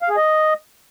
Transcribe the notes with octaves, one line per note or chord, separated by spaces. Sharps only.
F5
G#4
D#5